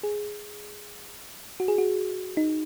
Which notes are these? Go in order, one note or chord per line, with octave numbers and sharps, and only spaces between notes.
G#4
F#4
G#4
F#4
D#4